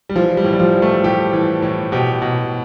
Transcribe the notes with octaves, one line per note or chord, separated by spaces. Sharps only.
G3
E3 F3
G3
A2
G3
F3
E3
A3
A2 G4
E3
A2
B2 G4
B2